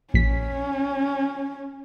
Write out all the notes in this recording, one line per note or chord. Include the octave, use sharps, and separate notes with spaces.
A#1 C#4 B6